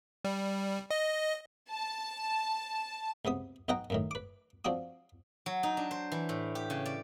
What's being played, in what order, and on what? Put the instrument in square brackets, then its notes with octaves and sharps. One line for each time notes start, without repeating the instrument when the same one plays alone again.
[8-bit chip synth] G3
D#5
[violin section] A5
[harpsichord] C#2 C3 B3 D#6
B1 B2 D#5 F#5 G5 A#5
F#2 A2 D#3
B4 D6
F3 C4 D4 F#4 D#6
[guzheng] F#3
D#4
D4
C5
E3
A2
G4
C#3
D5